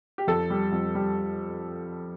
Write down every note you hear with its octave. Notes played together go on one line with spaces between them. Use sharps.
G4
F2 A4
G3
F2
G3